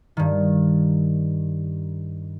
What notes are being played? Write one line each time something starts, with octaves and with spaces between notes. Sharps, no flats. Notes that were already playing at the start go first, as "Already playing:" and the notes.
G2 D#3